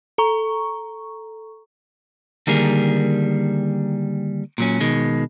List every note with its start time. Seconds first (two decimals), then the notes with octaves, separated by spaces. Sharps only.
0.18 A4 A#5 C#6
2.47 D3 D#3 G3 A#3 G#4 A#4
4.58 A#2 F#3 C#4
4.81 B2 D#3 G#3